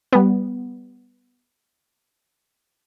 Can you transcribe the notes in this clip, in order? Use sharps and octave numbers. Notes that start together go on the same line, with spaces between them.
G3 B3